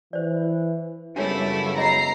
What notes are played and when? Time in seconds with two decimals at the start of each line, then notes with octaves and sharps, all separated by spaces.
0.13 E3 C5 D5
1.16 F#2 C#3 G3 A3 B3 D4 E4 C#5
1.77 C#5 D#5 A#5 B5 C7